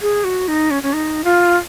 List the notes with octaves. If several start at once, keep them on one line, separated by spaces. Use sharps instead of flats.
G#4
F#4
D#4
C#4
C#4
D#4
F4